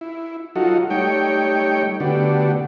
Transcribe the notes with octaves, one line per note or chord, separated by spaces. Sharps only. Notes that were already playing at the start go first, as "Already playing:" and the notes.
E4
F#3 D#4 F4 F#4 A4
G3 A3 D#4 C#5 G5
D3 A3 B3 D4 F#4 G4